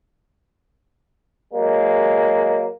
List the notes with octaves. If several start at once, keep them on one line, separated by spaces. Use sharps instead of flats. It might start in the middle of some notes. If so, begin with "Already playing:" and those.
F#3 G#3 A#3